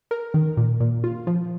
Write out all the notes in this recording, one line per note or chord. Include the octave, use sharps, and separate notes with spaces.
A#4
D#3
A#2
A#2
F4
F3